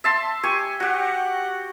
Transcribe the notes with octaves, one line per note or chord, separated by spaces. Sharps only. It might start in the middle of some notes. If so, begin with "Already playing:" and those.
E5 A5 C6
G4 G#5 C#6
F#4 G4 F#5